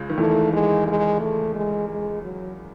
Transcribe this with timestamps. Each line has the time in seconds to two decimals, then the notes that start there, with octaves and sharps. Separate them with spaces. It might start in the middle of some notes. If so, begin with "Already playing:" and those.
Already playing: C#2 C#3
0.10 D#3
0.18 E2 E3 A3
0.53 G#3
0.87 G#3
1.20 A3
1.55 G#3
1.89 G#3
2.23 F#3